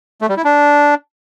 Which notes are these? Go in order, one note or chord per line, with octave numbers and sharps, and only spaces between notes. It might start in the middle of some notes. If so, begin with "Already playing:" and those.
A3
G3
E4
D4